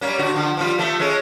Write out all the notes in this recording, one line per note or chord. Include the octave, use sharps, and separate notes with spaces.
G3 A#3 C#4
D3 F#4
D3 F3
F3 G3 F4
F3 A3
G#3 A3 C#4